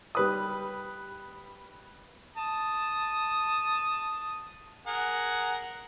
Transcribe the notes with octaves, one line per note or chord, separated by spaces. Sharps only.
G3 B4 D#6
A5 D#6
G#4 A#4 F#5